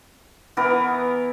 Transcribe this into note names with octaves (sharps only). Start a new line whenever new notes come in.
E3 B3 A#4